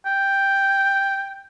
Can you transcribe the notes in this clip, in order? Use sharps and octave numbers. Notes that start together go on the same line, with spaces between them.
G5